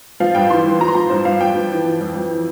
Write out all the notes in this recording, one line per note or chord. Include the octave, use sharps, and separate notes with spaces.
F3 F5
G2 G5
E3 C6
E3
F3 A#5
C6
F3 A#5
G2 C5
G2 F5
F3 G5
F3
E3
E3
F2
F2
E3